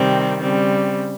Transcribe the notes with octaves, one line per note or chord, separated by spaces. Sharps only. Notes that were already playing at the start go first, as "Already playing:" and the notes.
Already playing: C3 D#3 G3 C4
C#3 G3 C4